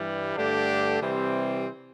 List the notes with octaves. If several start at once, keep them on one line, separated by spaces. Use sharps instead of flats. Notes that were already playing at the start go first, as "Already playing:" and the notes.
Already playing: G2 E3 G3
G2 D3 A3 D4 G4
C3 E3 G3 C4